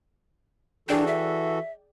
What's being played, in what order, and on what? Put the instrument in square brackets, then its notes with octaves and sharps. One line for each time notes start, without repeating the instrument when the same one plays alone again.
[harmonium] E3 F#4 A4 [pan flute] D4 [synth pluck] G#4 D5 G5
[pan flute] E5